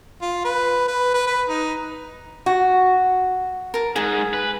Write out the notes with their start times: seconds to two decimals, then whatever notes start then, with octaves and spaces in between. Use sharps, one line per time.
0.22 F4
0.45 B4
0.88 B4
1.14 B4
1.27 B4
1.49 D#4
2.46 F#4
3.74 A#4 A5
3.96 G#2 G#4
4.33 B4